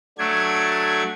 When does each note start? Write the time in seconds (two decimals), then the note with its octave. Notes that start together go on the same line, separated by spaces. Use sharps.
0.18 F#3 A3 D4 G#6